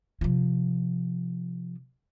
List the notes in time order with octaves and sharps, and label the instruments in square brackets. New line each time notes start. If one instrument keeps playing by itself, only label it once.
[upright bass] C3 F3